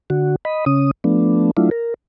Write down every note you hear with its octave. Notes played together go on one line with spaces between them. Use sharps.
D3 F#4
D#5 B5
C#3 C#4 D#6
F3 A3 B3 D4
F#3 A3 D4 E4 F4
A#4